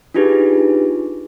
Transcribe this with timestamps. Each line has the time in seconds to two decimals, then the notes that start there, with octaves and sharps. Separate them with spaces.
0.14 D4 D#4 F4 G4 G#4 B4